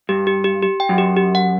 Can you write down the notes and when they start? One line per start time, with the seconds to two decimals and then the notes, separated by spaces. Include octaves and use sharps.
0.09 G2 G4
0.27 G4
0.44 G4
0.63 G4
0.80 G5
0.89 F#2
0.98 G4
1.16 G4
1.35 F#5